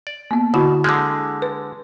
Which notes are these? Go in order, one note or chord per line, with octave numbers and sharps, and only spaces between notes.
D5
A#3 B3
B2 D3 E4 F#4
D3 G#3 F6 G6
B4